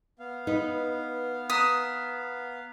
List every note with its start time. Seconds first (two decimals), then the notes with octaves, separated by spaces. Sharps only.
0.19 B3 F5
0.47 D#4 B4
1.50 A#5 D#6 F#6 B6